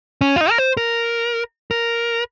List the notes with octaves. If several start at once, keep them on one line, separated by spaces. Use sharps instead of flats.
C#4
F4
D#4
A#4
C5
A#4
A#4